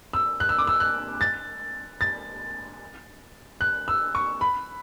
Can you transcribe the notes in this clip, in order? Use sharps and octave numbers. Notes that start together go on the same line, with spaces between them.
E6
F#6
E6
D6
E6
F#6
A6
A6
F#6
E6
C#6
B5